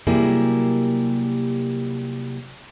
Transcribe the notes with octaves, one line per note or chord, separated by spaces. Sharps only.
C3 F#3 G3 A#3 E4 G#4